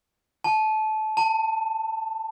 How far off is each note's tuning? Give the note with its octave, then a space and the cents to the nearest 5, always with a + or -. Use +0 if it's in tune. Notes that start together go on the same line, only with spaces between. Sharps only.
A5 -25
A5 +20